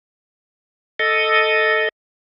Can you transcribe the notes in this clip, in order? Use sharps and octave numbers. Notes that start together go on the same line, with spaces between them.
A4 D#5